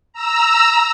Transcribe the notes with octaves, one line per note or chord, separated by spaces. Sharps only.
A#5 E6